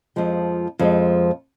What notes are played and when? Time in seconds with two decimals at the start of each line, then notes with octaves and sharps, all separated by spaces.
0.16 F2 F3 G#3
0.79 F2 F3 G#3